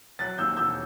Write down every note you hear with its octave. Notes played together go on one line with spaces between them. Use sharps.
F#3 F#6 A6
D#2 E6 G6
E1 E6 G6